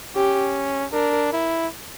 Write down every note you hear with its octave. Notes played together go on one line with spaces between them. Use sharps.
C#4 G4
D4 A#4
E4